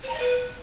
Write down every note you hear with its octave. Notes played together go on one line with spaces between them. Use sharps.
C5
A#5
D#5
B4